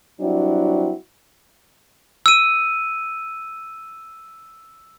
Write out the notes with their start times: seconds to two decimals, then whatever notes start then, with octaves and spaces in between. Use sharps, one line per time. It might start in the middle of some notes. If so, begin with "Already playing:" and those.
0.20 F#3 G3 C4 D4 E4 F#4
2.26 E6 D#7